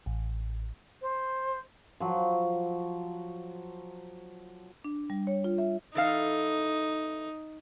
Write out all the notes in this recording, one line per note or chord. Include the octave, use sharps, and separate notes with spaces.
A1
C5
F3 F#3
D4
G3
C#5
F4
E5
E3 D#4 A4 F5